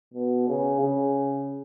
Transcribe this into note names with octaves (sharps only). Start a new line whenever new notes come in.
B2
C#3
C#3